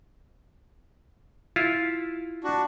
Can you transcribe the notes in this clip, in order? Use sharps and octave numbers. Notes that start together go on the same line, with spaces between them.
E4 F4
D4 F#4